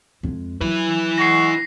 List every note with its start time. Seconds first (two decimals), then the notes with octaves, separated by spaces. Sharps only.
0.23 F2 G#3
0.61 F#3 E4 B4
1.18 G#3 F#5 C#6 A#6 C7